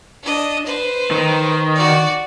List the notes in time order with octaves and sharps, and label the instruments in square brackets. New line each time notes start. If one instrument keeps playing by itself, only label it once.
[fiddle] D4 D#5
B4 C5
[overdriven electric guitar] D#3
[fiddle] F#4 D5